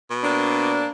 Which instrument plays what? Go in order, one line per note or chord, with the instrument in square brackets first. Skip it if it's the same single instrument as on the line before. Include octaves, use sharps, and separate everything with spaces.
[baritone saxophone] B2
[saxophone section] A#3 C4 D4